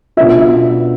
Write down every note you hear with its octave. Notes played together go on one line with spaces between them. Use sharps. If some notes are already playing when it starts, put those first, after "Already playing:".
B2 B3 D4 F4 E5